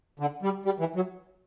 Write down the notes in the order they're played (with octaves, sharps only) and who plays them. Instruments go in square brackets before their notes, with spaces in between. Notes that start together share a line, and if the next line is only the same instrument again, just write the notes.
[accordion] D3
G3
G3
E3
F#3